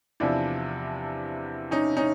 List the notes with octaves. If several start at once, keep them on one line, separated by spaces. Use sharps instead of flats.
E2 C3 F3 D4 E4
C#4 D#4
C#4 D#4